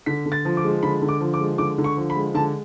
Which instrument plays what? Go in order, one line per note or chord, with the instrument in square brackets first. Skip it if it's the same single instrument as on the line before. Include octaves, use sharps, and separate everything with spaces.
[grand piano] D3 B6
D3
A6
F3
D6
G#3
D3 B5
D3
D6
F3
D6
G#3
D3 D6
D3
C#6
F3
B5
G#3
D3 A5